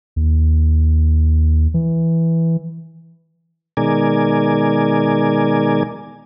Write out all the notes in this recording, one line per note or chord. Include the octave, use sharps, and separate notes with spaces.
D#2
E3
B2 D#3 G#3 A#4 D5 G#5